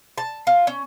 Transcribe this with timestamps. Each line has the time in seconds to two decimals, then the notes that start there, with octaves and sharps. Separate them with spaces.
0.18 A5
0.47 F4
0.67 C#4